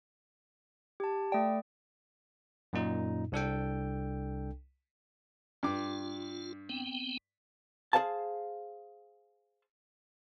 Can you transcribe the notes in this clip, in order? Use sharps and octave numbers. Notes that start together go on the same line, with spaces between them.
G4 A5
A3 D5 G5
F#2 A#2 D#4
C2 D4 A4 G5
G2 F4 D6
B3 C4 G5
G#4 A#4 C5 F5 A5